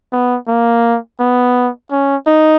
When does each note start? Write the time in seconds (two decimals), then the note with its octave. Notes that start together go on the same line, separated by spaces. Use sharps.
0.12 B3
0.48 A#3
1.20 B3
1.91 C#4
2.27 D#4